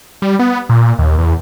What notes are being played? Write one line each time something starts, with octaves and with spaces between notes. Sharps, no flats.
G3
B3
A#2
D#2
E2